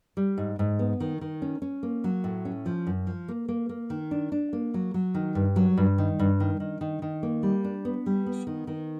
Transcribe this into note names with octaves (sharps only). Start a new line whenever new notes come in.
G3
G#2
G#2
B3
D#3
D#3
C#4
C#4
A#3
F#3
A2
C#4
F3
F#2
F3
A#3
A#3
A#3
D#3
D4
D4
A#3
F#3
F#3
D#3
G2
F#3
G2
D#3
G2
D#3
D#3
D#3
D#3
A#3
G3
D4
B3
G3
B3
D#3
D#3